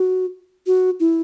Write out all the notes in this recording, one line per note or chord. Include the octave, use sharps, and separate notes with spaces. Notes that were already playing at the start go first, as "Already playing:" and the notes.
Already playing: F#4
F#4
E4